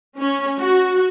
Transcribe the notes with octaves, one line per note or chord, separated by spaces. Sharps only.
C#4
F#4